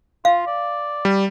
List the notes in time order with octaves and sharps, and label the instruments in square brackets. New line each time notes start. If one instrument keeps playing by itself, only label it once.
[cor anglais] F4 [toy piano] F5
[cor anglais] D5
[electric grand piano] G3